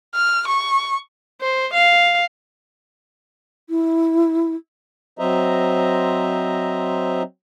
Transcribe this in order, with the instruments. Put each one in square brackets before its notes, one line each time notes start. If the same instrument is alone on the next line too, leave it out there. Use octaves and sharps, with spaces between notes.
[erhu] F6
C#6
[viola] C5
F5
[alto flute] E4
[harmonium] F#3 C4 C5 D#5 E5 A#5